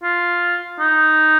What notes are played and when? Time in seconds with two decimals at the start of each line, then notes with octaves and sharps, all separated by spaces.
0.03 F4
0.80 D#4